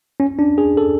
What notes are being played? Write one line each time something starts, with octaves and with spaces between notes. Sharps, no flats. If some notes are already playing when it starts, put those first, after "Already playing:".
C#4
D4
G#4
A4